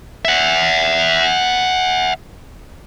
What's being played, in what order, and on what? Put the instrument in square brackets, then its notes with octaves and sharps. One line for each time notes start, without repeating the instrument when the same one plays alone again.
[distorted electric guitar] E5 F#5